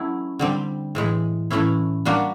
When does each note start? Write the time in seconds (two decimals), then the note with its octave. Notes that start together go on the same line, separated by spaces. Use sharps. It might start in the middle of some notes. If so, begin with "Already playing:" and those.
Already playing: F#3 A3 C#4 E4
0.39 D3 G3 C4
0.95 A2 E3 G#3
1.50 A2 E3 A3 C#4 E4
2.05 G3 A#3 D4 F#4